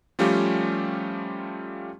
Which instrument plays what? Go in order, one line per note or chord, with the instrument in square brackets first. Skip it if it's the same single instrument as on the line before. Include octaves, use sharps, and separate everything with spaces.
[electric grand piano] F3 G3 A3 C#4 F4 G4